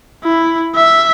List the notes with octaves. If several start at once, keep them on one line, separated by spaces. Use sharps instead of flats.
E4
E5